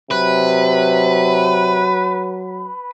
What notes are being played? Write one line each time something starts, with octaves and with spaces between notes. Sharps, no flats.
C3 F#3 B4